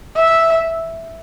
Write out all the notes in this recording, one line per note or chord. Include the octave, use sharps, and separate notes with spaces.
E5